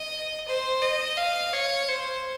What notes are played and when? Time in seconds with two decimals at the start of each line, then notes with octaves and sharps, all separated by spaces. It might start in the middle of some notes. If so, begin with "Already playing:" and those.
Already playing: D#5
0.47 C5
0.82 D#5
1.17 F5
1.53 C#5
1.88 C5